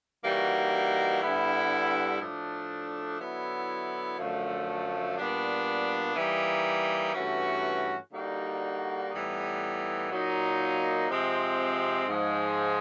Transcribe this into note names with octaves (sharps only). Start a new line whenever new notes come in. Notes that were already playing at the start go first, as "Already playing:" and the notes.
E3 G3 A#3 D#4 F#4
G2 D3 G3 B3 E4
A2 F3 A3 D4
D3 F#3 B3 E4
F#2 D3 F3 A3
A#2 G3 B3 D4
E3 G3 A#3 D#4
G2 E3 A3 C#4 F#4
D3 G3 A#3 D#4 F#4
A2 E3 G3 B3 D#4
A#2 F#3 A#3 D#4
C3 F3 G#3 C4
G#2 F3 G#3